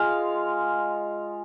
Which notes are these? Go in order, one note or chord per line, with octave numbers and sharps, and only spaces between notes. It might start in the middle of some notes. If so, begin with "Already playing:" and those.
Already playing: G#3 F4 F5